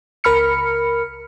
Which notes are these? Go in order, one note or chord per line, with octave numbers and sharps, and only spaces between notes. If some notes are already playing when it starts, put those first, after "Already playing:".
C#2 A#4 B5 F6 C#7